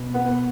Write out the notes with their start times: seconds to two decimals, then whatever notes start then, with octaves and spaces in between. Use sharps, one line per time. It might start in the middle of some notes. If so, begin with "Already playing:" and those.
Already playing: B2
0.14 B3